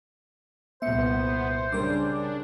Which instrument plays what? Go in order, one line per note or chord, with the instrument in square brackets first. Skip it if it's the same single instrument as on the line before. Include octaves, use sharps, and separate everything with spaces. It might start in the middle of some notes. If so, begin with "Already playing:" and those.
[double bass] C2 A#2 [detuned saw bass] B3 [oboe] C5 [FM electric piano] E5 C#7
[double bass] C#3 G3 [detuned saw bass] D4 [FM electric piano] A#4 D6